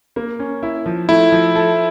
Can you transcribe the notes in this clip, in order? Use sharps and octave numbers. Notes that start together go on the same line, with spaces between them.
A#3
C#4
E4
F3
A3 E4
F3
A4